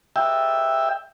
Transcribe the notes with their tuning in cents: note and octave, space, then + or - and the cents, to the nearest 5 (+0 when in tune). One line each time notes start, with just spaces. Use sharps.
E5 +0 G5 +15